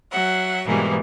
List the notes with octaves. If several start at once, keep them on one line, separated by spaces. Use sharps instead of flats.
F#3 E5 F#5
G#2 B2 E3 G3 G#3 A#3